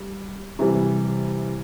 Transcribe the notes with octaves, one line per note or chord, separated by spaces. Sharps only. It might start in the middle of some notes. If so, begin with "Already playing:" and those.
Already playing: G3
C3 E3 G3